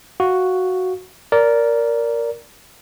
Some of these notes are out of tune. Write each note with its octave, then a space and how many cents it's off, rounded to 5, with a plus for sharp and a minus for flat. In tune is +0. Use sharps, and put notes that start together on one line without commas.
F#4 +0 F5 +0
A#4 +0 D5 -20